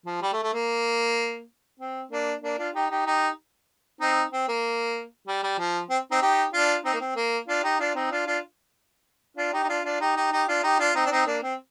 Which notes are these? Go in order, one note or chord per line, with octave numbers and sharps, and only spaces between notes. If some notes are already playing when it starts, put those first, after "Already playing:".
F3
G3
A3
A3
A#3
C4
A#3 D4
A#3 D4
D4 F4
D#4 G4
D#4 G4
D#4 G4
C4 D#4
C4
A#3
G3
G3
F3
C4
C4 D#4
D#4 G4
D4 F4
C4 D#4
A#3
C4
A#3
D4 F4
D#4 G4
D4 F4
C4 D#4
D4 F4
D4 F4
D4 F4
D#4 G4
D#4
D4 F4
D4 F4
D#4 G4
D#4 G4
D#4 G4
D4 F4
D#4 G4
D4 F4
C4 D#4
D4
C4 D#4
A#3 D4
C4